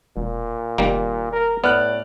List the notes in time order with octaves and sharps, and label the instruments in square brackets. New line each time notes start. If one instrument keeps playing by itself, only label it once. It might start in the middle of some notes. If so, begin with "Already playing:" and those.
[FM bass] E1 [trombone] A#2
[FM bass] F1 [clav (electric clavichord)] D#3 G3 A#3
[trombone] A#4
[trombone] A2 [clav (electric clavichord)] B3 [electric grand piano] D5 F6 F#6